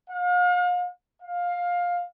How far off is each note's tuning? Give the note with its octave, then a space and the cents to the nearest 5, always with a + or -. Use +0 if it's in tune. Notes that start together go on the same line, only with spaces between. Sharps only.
F5 +40
F5 +15